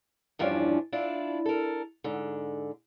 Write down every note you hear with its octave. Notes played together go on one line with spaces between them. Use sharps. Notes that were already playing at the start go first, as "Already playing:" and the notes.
E2 G2 F3 C#4 D4
D4 E4 F4
A4 A#4
G#2 D3